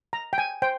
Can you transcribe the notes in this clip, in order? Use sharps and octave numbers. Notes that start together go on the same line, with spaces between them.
A#5
G5
G#5
C5 G5